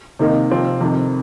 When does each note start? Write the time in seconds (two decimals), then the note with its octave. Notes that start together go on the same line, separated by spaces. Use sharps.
0.19 C3 D#3 A#3 D#4
0.51 C3 F3 C4 F4
0.81 F2 C3 D#3